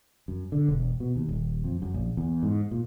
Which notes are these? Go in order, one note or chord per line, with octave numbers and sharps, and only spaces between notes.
F#2
D3
E1
B2
D#2
D#1
F2
F#2
A#1
E2
G#2
A#2